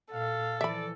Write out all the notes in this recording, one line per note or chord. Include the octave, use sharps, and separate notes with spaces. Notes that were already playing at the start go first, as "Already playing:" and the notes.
A#2 A4 F5
E3 F3 D5 E5 B5